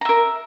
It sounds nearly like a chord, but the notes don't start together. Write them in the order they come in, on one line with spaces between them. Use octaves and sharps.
A#5 E5 A#4